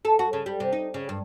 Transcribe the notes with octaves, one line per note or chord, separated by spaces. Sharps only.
A4
F#4
C#3
G3
C3
D#4
C#3
G2